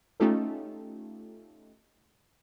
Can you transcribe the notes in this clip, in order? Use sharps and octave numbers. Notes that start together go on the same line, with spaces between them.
A3 C#4 D#4 F4 G4 A4